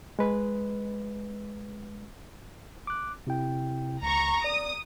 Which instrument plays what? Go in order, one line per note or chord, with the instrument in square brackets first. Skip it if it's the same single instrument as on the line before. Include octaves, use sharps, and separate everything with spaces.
[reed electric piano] G#3 B4
[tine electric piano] D6 F#6
C3 E4 G5
[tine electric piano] C#2 [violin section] A#5 C#6
[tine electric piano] D5 [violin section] D#6